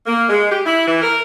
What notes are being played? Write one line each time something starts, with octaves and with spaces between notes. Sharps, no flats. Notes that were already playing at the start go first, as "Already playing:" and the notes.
A#3
G#3
G4
E4
E3
A#4